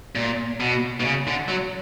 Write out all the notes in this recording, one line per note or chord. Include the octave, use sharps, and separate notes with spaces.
A#2
B2
B2
C#3
D3
F#3